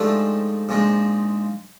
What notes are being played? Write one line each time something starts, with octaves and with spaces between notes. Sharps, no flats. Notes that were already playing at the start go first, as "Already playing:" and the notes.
Already playing: G#2 F3 A3 D4 G4
A#1 G#2 F3 G#3